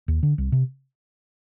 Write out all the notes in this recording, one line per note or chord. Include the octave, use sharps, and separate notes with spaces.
D#2
D3
C2
C3